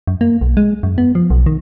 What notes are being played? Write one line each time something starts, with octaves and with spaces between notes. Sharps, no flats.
F#2
A#3
B1
G#3
F#2
B3
F3
B1
D#3